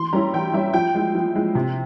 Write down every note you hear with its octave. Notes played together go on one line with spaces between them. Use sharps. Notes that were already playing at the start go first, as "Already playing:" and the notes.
Already playing: E3 C6
G3 C#4 E4 A#5
E3 G5
G3 C#4 E4 E5
F3 G5
G#3 E4
F3
G#3 E4
C3